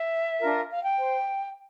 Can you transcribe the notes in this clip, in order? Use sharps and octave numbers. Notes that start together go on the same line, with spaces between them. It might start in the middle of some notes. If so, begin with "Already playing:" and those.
Already playing: E5
D4 F4 A#4
F5
G5
C5